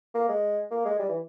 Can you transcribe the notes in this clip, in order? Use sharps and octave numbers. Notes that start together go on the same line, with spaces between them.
A#3
G#3
A#3
G#3
G3
E3